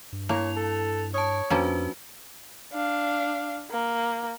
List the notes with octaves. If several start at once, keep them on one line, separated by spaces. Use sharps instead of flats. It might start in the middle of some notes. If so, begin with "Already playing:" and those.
G2
A#3 E4 C#5 F7
A4
C#5 A5 D#6
F2 F3 A#3 C#4 D4 F#4 B4
D4 F5
A#3